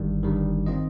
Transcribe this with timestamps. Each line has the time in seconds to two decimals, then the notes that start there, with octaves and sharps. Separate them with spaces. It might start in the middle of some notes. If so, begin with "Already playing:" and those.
Already playing: G1 G2 D#3 G3
0.23 G1 G2 D#3 G3
0.66 D#3 C4 F4 D#5